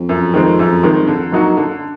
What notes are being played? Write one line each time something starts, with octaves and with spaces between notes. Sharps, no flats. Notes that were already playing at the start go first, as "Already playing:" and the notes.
Already playing: F2
F#2
D#3 G#3 C4
F#2
D#3 G#3 C4
F#2
F2 D3
F#3 A#3 D#4 F#4
F#2 D3